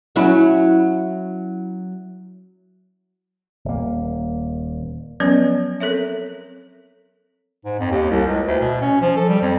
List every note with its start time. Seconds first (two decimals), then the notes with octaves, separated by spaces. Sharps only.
0.16 F#3 C#4 E4
3.65 D#1 A#3
5.20 F3 F#3 B3 C#4 B4
5.80 C4 A4 A#4 C#5 E5
7.65 G#2
7.80 F2
7.91 D#2
8.11 C2
8.28 C#2
8.47 D2
8.61 B2
8.81 C#4
9.01 F3
9.17 A4
9.29 G3
9.42 F2